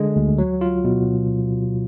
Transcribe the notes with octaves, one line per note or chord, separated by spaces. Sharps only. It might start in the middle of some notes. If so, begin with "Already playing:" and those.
Already playing: D3 G#3
D2
F#3
F4
B2